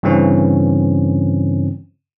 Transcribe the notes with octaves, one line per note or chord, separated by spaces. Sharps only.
G2 C#3 E3 C4 C#4